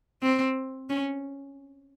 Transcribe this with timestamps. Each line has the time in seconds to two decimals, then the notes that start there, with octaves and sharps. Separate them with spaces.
0.22 C4
0.89 C#4